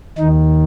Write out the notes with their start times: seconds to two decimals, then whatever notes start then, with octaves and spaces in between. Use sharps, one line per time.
0.18 D#2 D#3 D#4